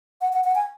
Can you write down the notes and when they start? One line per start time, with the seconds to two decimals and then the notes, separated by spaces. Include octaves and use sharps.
0.21 F#5
0.33 F#5
0.44 F#5
0.55 G#5